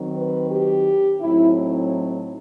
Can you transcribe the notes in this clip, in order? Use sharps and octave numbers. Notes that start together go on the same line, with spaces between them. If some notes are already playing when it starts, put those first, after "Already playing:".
Already playing: D#3 F#3 C4
B4
G4
A2 F#3 C4 D#4 E4